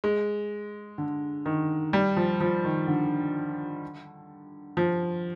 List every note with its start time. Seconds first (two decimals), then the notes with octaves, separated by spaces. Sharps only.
0.04 G#3
0.98 D3
1.46 D#3
1.93 G3
2.17 F3
2.40 F3
2.64 D#3
2.88 D3
4.77 F3